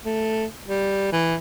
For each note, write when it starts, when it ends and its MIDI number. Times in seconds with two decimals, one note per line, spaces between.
0.05 0.45 57
0.67 1.09 55
1.12 1.36 52